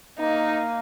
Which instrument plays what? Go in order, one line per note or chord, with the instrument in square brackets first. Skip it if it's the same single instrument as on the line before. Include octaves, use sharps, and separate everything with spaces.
[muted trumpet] A#3 [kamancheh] D#4